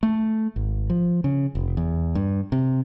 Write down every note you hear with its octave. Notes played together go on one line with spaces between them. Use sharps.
A3
G#1
F3
C#3
F1
E2
G2
C3